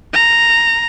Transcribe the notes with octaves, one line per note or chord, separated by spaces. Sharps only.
A#5